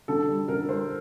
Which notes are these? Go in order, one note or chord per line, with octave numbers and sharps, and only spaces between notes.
D3 A4
G3
D3 A#4
G3 C5